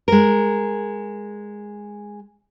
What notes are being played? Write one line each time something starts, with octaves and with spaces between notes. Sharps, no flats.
G#3 A#4